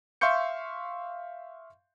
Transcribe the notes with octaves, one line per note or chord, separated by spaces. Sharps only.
E5 F5 C6 C#6 G6 C#7